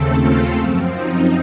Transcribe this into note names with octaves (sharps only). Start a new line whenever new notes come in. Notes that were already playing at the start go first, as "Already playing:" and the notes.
Already playing: D#2 C#3 A3 C4 A4
F4
F#2 F3 C4
D#4